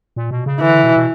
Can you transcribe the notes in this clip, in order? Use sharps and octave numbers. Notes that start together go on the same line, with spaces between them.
A#2
B2
C#3
D3 E3
B2
B2